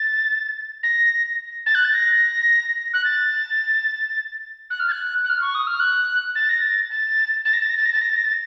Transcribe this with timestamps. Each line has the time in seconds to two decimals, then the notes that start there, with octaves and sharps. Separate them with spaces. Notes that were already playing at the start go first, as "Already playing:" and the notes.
Already playing: A6
0.83 A#6
1.66 A6
1.75 F#6
1.85 A6
1.94 A#6
2.94 F#6
3.04 A6
4.70 F#6
4.80 F6
4.88 A6
4.92 F#6
5.24 F#6
5.29 F6
5.42 C#6
5.55 D#6
5.67 F6
5.80 F#6
6.35 A6
6.49 A#6
6.62 A6
6.91 A6
7.45 A6
7.53 A#6
7.61 A6
7.70 A#6
7.77 A6
7.86 A#6
7.93 A6
8.01 A#6
8.09 A6
8.16 A#6
8.24 A6